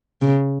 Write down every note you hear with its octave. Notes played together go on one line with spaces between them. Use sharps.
C#3